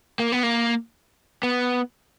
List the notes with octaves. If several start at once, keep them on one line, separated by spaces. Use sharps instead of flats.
A#3
B3
A#3
B3